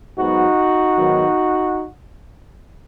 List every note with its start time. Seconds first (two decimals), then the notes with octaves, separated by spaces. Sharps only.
0.18 G#2 F#3 B3 D#4 F#4
0.98 G#2 D#3 F#3 B3